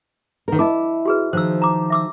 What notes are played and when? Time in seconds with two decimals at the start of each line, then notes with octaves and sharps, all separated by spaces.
0.48 D#3 A#4
0.59 E4 D#5 A5 D6
1.05 F#4 G#4 B4
1.33 D#3 F3 C5 E6
1.62 A#5 D6
1.90 E5 D6 E6